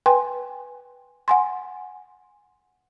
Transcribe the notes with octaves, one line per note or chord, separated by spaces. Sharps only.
B4 G5 G#5 C6
F#5 G#5 C6